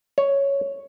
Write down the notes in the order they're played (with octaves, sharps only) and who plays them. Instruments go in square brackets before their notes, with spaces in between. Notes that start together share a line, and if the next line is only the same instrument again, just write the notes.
[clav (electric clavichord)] C#5